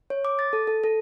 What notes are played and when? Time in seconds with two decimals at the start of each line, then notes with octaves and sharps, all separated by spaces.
0.10 C#5
0.25 D6
0.39 A6
0.53 A4
0.67 A4
0.84 A4